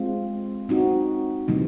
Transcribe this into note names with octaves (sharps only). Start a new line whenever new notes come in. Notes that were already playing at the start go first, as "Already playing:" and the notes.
Already playing: G#3 C4 F4
C4 D#4 F#4
C3 E3 G3 A#3 D#4